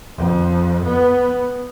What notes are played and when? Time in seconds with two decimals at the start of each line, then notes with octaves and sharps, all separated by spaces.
0.17 F2
0.85 B3